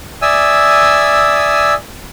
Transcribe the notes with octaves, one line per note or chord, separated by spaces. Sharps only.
D5 E5 G#5 D#6 E6